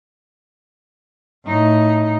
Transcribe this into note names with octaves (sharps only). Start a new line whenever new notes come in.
A2 D#4